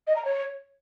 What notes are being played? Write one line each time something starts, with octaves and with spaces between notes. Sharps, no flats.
D#5
A#5
C#5